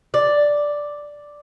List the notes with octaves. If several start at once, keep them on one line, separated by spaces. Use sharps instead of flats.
D5